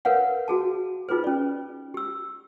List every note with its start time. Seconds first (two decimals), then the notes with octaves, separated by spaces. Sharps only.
0.05 A#4 B4 C#5 F5 F#5
0.48 F#4 G#4 A5
1.09 D#4 F4 G#4 B4 C5
1.24 C#4 D5
1.94 G4 E6